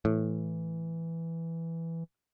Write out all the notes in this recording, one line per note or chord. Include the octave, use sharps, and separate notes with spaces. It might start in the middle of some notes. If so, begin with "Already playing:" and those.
A2 E3